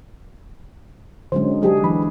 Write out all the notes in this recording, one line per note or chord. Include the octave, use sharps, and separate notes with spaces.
D3 F#3 G#3 C#4 C5
F#3 D4 D#4 G4 G#4
E3 B5